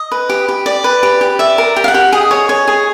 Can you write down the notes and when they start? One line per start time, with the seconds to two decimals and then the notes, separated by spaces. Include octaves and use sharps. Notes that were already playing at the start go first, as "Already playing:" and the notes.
Already playing: D#5
0.12 B4
0.29 G4
0.49 G4
0.66 D5
0.84 B4
1.03 G4
1.21 G4
1.39 D5 E5
1.58 A#4
1.76 G4
1.84 F5
1.88 F#5
1.94 G4
2.12 G#4 D#5
2.31 C#5
2.49 C#5
2.68 G#4